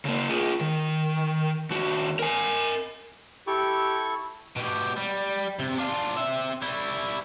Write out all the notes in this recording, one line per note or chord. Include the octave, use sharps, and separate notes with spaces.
C#3 A#3
F4 G#4
D#3
D#2 F#4
A#4 G#5
E4 G4 A4 C#6
B2 G4
G3
C3
D4 F4
C4 E5
G3 E4